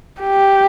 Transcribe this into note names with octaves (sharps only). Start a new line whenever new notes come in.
G4